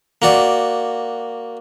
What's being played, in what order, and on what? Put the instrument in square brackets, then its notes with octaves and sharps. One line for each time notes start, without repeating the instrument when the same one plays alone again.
[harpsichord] A#3 F#4 D5